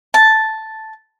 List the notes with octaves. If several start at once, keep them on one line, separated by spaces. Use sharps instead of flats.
A5